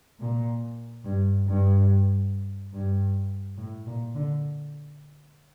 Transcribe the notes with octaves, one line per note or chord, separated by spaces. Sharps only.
A#2
G2
G2
G2
A2
A#2
D3